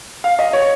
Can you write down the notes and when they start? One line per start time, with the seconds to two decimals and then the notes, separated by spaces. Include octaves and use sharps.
0.24 F5
0.39 D#5
0.53 C#5